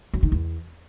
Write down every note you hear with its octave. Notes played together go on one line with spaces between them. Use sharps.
F#2
D#3
E2